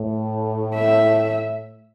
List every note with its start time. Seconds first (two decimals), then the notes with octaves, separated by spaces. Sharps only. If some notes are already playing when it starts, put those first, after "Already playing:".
Already playing: A2
0.75 E5